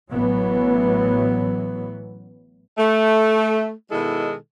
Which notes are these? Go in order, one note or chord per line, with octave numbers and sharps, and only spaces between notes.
A1 E3 F#3 B3
A3
B2 D#3 G#3 E4 A4